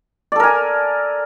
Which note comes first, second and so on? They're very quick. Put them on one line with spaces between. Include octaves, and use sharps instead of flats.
D5 A4 A#4 G#5